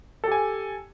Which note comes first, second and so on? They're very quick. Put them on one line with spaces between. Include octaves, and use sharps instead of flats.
A4 G4 G#5